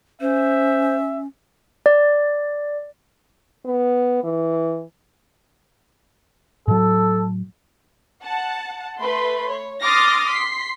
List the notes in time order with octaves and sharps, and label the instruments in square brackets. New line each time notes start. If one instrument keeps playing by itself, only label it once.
[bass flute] C#4 [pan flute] C5 [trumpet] E5
[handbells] D5
[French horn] B3
E3
[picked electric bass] A2 F#3 [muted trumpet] A4
[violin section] F#5 A5
A3 B4 B5 C6
C#5
C6 D6 D#6 F6 A6 A#6
C6 B6 C7